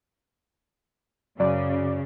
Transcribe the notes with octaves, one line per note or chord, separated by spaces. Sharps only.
F#2 C#3 D5